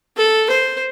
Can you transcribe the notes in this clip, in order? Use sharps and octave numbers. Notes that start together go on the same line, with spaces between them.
A4
C5